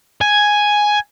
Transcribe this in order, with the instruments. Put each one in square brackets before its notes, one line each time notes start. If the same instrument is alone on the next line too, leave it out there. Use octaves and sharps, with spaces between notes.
[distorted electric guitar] G#5